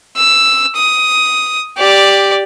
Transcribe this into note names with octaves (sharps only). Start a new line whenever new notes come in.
E6
D#6
G4 D5